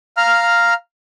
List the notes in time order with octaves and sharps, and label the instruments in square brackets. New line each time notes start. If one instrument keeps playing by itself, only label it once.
[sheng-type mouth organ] F5 A#5 F6